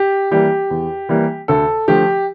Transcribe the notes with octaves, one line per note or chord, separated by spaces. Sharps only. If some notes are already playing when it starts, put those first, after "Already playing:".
Already playing: G4
E3 G3 A#3 G4
E2
E3 G3 A#3
D2 A4
D3 F3 A3 G4